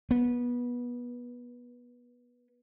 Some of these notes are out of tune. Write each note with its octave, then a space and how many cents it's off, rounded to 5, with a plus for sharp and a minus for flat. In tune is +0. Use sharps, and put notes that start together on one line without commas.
B3 -20